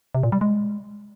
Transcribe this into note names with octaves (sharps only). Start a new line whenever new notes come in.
C3
A#2
G3
G#3